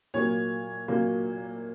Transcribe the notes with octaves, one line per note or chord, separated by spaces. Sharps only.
A#2 F#3 A#3 C#5
A#2 F#3 A#3